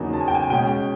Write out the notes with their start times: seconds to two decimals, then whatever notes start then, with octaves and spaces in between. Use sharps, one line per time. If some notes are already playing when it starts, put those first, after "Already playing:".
Already playing: E2 C#3 F#3 A#3 D#4
0.13 A5
0.21 G#5
0.28 G5
0.35 G#5
0.50 B2 G#3 C#4 G5